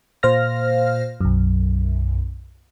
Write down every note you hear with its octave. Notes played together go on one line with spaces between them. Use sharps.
A#2 C5 F5 F6 A#6
B1 F#2